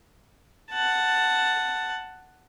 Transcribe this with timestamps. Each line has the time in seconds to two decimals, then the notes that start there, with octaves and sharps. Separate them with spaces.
0.71 F#5 A5